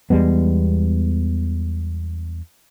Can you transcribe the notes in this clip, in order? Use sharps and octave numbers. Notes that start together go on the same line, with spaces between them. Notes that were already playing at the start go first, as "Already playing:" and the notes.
E2 G3 G#3 B3